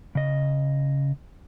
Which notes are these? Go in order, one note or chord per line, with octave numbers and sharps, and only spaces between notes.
C#3 D#5